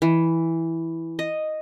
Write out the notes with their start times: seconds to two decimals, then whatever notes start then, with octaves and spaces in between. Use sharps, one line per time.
0.02 E3
1.19 D#5